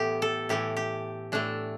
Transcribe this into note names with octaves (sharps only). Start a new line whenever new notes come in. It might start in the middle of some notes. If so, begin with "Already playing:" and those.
Already playing: A2 E3 A3 B3 G4
A4
A2 E3 A3 G4
G4
A2 E3 A3 D4